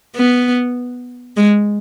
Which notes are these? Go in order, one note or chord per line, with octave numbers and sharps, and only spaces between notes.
B3
G#3